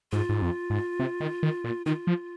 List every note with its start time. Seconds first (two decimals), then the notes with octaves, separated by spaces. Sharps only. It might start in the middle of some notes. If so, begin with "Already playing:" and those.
0.12 G#2 F4
0.29 G#2
0.42 F2
0.70 G#2
0.99 C3
1.20 D#3
1.43 D#3
1.64 A#2
1.86 D#3 F4
2.07 F3